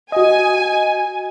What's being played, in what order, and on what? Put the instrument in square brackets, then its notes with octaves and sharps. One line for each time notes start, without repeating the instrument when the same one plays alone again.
[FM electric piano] F#4 D#5 [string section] G#5